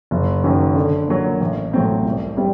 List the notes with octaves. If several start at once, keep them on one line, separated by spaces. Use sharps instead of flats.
F#1
F#2 D#3 F#3
D3
F#3 A#3
A1
A2 F#3 C4
C2
G3 C4 G4